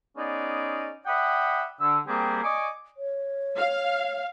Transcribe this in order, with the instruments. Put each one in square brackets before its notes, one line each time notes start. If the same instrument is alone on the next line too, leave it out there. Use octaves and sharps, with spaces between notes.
[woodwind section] B3 C#4 D#4 G#4 D5
D5 E5 F#5 G5 B5 D#6
D3 E6
G3 A#3 C4 G4 G#4
D5 D#5 G#5 C#6 D6
[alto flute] C#5
[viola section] F5